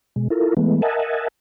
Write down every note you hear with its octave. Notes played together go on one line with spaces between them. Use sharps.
B2 G#3
E4 F4 A4 A#4
E3 G#3 A3 B3
A#4 D#5 E5 F#5 G#5 A5